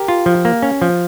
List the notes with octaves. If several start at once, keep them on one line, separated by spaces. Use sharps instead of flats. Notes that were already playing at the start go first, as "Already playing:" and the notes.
Already playing: G4 A#4
F4
F3
A#3
C#4
F3